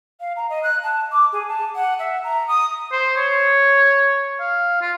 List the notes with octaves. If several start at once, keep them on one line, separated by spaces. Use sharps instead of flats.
F5
A#5
D#5
F#6
A5
D6
G#4
A5
F#5
E5
A#5
D#6
C5
C#5
F5
F4